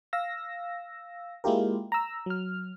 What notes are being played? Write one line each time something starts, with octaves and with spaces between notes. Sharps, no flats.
F5 E6 A#6
G#3 A#3 E4 F4 G4 A#4
A#5 E6
F#3 F6